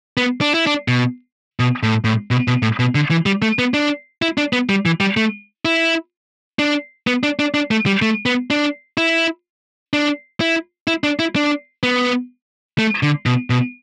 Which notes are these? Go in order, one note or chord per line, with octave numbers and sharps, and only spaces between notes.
B3
D4
E4
D4
B2
B2
A2
A2
B2
B2
A2
B2
D3
E3
G3
A3
B3
D4
E4
D4
B3
G3
E3
G3
A3
E4
D4
B3
D4
D4
D4
A3
G3
A3
B3
D4
E4
D4
E4
E4
D4
E4
D4
B3
A3
D3
B2
B2